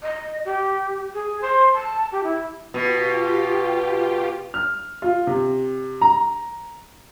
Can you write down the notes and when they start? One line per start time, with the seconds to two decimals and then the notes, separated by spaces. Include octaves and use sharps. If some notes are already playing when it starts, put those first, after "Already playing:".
0.03 D#5
0.45 G4
1.14 G#4
1.42 C5
1.73 A5
2.12 G4
2.24 E4
2.74 B2 F4 G4
4.54 F6
5.02 F4
5.27 C3
6.02 A#5